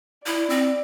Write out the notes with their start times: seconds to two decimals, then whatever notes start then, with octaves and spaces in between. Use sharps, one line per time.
0.26 E4 D5
0.50 C4